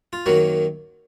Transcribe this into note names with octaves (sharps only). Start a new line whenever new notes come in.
F4
F#2 D#3 F#3 A#3 F#4